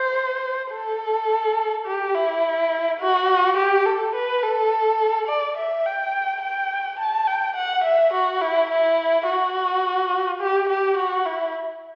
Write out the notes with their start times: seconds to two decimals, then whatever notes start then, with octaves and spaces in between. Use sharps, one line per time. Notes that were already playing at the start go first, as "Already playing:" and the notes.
Already playing: C5
0.72 A4
1.86 G4
2.14 E4
3.00 F#4
3.57 G4
3.86 A4
4.15 B4
4.43 A4
5.28 D5
5.57 E5
5.86 G5
6.42 G5
6.99 A5
7.27 G5
7.56 F#5
7.84 E5
8.14 F#4
8.41 E4
8.71 E4
9.27 F#4
10.41 G4
10.69 G4
10.97 F#4
11.26 E4